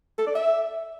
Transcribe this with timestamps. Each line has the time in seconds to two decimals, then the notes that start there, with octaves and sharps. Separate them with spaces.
0.18 A4
0.27 D5
0.35 E5